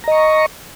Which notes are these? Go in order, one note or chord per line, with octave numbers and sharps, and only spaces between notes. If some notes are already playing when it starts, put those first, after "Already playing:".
D#5 A#5 C#6